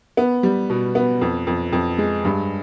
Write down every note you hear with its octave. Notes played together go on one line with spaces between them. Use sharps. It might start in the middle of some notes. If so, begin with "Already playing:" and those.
B3
G3
B2
B3
F2
F2
F2
G#3
G2